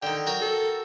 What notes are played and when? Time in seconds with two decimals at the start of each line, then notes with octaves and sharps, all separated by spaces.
0.03 D3 D#3 G5
0.27 F#3 F#4 A#4 G5
0.41 A4